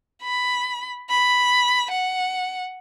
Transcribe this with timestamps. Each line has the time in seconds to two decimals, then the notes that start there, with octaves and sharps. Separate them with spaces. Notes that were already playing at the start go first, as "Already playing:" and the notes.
0.23 B5
1.10 B5
1.91 F#5